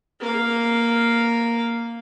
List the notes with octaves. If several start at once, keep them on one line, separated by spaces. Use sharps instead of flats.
A#3 F5